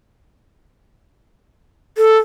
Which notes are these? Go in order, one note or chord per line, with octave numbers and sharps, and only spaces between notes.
A4